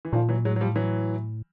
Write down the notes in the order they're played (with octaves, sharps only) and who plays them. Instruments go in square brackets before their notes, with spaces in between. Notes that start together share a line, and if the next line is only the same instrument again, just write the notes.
[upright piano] E3
[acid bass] A#2 [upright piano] D#3 F3
[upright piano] E3 F#3
[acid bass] A2 [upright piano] F#3 G#3
[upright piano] F#3
F3 G3
E3 F#3